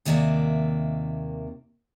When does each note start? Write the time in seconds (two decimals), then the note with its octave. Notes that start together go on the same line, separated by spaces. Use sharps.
0.05 D#2 C3 D#3 A#3 D5 E5